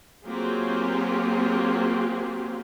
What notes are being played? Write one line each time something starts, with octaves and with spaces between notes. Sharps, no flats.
F#3 A#3 C4 F4 G4 G#4